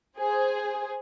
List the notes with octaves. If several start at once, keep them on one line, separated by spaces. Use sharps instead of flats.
G#4 C5